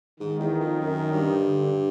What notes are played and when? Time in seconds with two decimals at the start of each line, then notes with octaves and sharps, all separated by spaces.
0.19 G#2 D#3
0.40 E2
0.60 F2
0.80 F#2
1.11 G2
1.41 D3